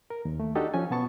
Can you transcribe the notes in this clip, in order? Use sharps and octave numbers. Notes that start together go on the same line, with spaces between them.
A#4
D#2
A3
D4 D#4 F#4 G4 A4 D#5
F3 C#4 G#5
B2 B3 A5 C#6